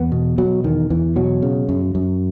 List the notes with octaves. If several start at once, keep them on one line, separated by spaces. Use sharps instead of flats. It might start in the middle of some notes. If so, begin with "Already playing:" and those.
Already playing: E2 B3
B2
B2 F#3
E2 D#3
E2 E3
B2 F#3
C#3
F#2
F#2